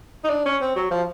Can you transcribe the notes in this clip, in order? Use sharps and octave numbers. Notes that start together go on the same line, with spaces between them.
D#4
D4
C#4
C4
F#3
F3